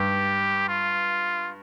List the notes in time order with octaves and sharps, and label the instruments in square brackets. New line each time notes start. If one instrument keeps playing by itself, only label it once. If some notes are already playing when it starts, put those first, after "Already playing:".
Already playing: [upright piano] G2 [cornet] G4
[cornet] F4